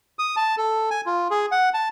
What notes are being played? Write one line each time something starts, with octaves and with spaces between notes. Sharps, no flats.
D#6
A5
A4
G#5
F4
G#4
F#5
A5